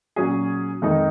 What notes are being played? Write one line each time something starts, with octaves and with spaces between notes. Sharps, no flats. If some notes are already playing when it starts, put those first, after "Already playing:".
A#2 F#3 C#4 G#4
F2 D#3 G#3 D#4